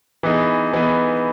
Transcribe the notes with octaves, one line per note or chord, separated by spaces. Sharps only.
E3 B3 D#4 G#4
E3 B3 D#4 G#4